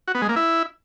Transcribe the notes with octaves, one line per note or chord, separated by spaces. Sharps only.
F#4
B3
G#3
A#3
E4